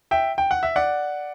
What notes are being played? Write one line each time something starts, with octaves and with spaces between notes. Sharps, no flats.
E5 G5
G5
F#5
E5
D5 F#5